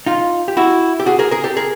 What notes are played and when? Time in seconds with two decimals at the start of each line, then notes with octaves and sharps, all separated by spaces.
0.06 D#4 F4
0.48 G4
0.57 E4 F#4
1.00 G4
1.06 F#4 G#4
1.19 G#4 A#4
1.31 G#4 A#4
1.44 G4 A4
1.57 G#4 A#4